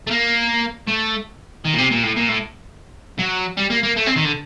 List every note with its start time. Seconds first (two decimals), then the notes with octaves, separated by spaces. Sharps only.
0.07 A3
0.11 A#3
0.88 A3
1.65 D#3
1.74 A#2
1.78 C3
1.91 A#2
2.03 A2
2.16 A#2
2.29 A2
3.19 F#3
3.57 G3
3.70 A#3
3.83 A#3
3.96 A3
4.06 C4
4.16 D#3
4.24 D3